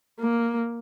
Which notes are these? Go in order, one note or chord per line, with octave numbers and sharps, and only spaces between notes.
A#3